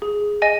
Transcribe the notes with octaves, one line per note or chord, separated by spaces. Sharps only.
G#4
D#5 G#5